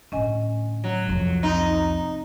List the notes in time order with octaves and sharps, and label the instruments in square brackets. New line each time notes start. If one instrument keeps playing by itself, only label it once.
[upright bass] A2 D3 [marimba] C#4 D#5 G#5
[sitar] F#3
[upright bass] C2 F2
[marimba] C4 [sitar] D#4